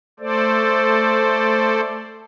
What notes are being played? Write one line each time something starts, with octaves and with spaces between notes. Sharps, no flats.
A3 A4 C5 D5